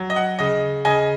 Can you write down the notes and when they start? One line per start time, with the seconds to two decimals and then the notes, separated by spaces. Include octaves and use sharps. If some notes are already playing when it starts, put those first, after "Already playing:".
Already playing: F#3
0.10 D#5
0.16 F#5
0.39 C#3 D#5
0.85 C#3 D#5 G#5